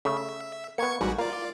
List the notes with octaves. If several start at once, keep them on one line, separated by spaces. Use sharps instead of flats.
C#3 A3 E5
A#3 B3 C#6 G#6 C#7
A1 G#2 G3 F#4
A#3 F4 D5